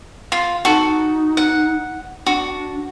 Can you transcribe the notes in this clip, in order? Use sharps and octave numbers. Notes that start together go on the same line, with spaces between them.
F4
D#4 F#4 A4
F#5
D4 F#4